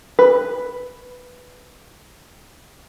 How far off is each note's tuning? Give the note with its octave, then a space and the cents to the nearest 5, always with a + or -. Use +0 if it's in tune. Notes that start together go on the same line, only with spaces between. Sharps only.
B4 +5